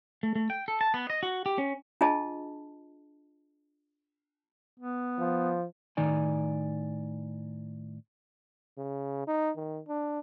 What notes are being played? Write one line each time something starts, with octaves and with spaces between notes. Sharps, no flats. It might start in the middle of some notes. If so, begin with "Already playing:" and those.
A3
A3
G5
A4
A5
B3
D#5
F#4
G4
C#4
D4 F4 G#4 D#5 A5
B3
F3
A2 D#3 D#4 D5 G#5
C#3
D#4
D#3
D4